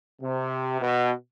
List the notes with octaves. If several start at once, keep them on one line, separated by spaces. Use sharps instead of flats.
C3
B2